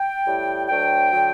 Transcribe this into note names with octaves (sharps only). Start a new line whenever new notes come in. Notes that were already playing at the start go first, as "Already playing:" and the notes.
Already playing: G5
A2 G3
D2 D3 F#3 G5
D3 F#3